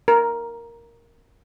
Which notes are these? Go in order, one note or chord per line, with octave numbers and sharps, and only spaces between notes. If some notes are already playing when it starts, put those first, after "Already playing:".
A#4